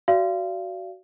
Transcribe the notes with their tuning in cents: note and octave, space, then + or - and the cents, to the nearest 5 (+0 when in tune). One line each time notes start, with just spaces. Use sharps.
F#4 +10 D5 -15 F5 -30